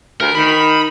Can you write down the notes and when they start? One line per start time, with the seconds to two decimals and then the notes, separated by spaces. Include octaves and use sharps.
0.21 D2 A#4
0.35 D#3 B5